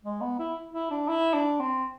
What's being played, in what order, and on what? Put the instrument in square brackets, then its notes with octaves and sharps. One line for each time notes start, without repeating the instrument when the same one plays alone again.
[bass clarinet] G#3
B3
E4
E4
D4
E4
D4
C4